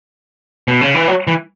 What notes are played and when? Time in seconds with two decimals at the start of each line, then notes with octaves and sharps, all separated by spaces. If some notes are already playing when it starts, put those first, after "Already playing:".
0.68 B2
0.81 C#3
0.94 E3
1.08 F#3
1.28 E3